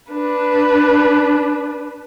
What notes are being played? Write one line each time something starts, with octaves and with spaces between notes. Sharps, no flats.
D4 B4